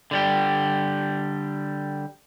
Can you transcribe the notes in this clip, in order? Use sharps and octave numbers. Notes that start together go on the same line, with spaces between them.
D3 G3 G4